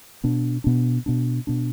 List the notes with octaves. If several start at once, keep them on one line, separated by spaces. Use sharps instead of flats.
B2 B3 D4
B2 B3 D4
B2 B3 D4
B2 B3 D4